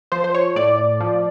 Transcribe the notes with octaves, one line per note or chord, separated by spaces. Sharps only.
F3 C5
C5
C#5
A2 D5
F3